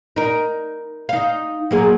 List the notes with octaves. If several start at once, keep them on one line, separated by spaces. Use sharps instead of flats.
D#4 A#4
D#4 F5
F#3 A#3 G#4